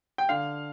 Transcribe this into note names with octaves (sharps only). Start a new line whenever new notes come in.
G5
D3 F5